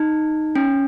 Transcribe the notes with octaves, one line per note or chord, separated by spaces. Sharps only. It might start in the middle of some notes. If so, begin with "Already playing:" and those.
Already playing: D#4
C#4